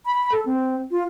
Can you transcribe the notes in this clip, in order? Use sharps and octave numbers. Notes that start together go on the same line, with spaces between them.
B5
A4
C4
F4